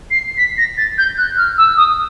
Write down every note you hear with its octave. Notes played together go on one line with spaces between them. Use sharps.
C7
B6
A#6
A6
G6
F#6
F6
E6
D#6